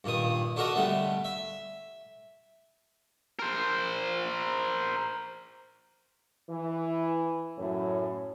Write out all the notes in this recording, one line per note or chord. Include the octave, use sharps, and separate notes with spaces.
G2 A#2 D#3 D#6
D4 F#4 A4 A#4 D#5
D3 G3 A3 B3
E5
A#4 C5
E3
F#2 A2